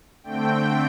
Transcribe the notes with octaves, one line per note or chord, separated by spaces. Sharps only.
D3 A3 C4 G5